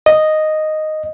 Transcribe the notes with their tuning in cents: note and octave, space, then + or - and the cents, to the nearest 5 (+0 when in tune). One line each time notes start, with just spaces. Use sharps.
D#5 -5